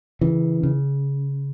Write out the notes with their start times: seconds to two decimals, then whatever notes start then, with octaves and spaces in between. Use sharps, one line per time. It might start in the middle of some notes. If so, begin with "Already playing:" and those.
0.21 C#3 E3
0.63 C#3